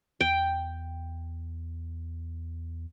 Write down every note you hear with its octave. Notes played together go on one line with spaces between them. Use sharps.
E2 G5